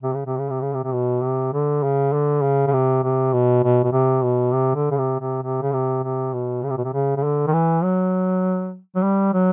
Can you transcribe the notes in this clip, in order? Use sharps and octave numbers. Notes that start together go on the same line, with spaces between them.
C3
C#3
C3
C#3
C3
C#3
C3
C3
B2
C3
D3
C#3
D3
C#3
C#3
C3
C3
B2
B2
B2
C3
B2
C3
D3
C#3
C3
C3
C3
C#3
C3
C3
B2
C#3
C3
B2
C3
C#3
C#3
D3
D#3
E3
F#3
F#3
G3
F#3